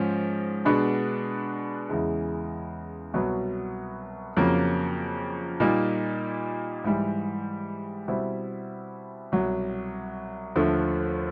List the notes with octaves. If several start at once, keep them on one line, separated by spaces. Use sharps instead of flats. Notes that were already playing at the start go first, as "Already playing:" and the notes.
Already playing: G#2 F3 C#4
B2 G#3 B3 D4
E2 C#3 E3 G#3
C2 B2 F#3 B3
F2 C#3 F#3 A#3
A#2 G3 A#3 D#4
G#2 E3 G3
B2 G3 C4 E4
C2 B2 F#3
D#2 D3 F3 A3